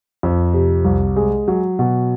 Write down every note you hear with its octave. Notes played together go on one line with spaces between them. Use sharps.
F2
C3
C2
G#3
F#3
B2